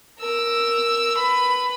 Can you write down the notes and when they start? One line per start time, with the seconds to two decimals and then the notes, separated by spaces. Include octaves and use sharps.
0.20 A#4 E6
1.17 B4 B5